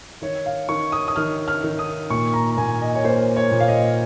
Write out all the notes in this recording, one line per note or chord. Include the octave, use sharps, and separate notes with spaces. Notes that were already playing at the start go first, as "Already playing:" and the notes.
D#3 C#5
F5
D#3 C#6
D#6
D#6
D#3 F6
F6
D#3
D#6
A#2 C#6
A#5
A#5
A#2 G#5
D#5
C#5
A#3 C5
C#5
A#2
F5
D#5